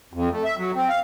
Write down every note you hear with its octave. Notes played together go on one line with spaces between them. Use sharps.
F2
A3
E5
F#3
C4
F5